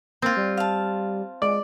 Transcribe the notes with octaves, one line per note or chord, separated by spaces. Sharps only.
A#3 C4 F4
G3
F5 A5
G#3 D5